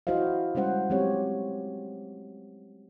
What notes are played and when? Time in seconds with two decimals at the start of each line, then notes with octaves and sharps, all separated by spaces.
0.07 E4 F#4 C5 D#5 F5
0.55 G3 G#3 C#4 C5 F#5
0.90 F#3 G#3 C4 G4 C#5